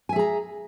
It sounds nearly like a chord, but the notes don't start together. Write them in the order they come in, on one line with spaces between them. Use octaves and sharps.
G#5 E5 G#4 A#5